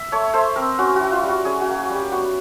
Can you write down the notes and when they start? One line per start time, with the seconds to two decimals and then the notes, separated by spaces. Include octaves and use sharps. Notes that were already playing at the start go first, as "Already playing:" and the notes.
Already playing: E5
0.12 A3 C#5
0.34 A3 C5
0.56 C4 A#4
0.79 C#4 F#4
0.96 E4 F#4
1.12 F4
1.23 G3
1.28 F#4
1.45 C#4 G#4
1.61 F#4
1.68 A#3
1.89 G3
1.95 G4
2.12 B3 F#4